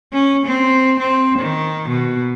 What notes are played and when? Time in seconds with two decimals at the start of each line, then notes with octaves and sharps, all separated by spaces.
0.13 C#4
0.46 C4
0.99 C4
1.39 D#3
1.89 B2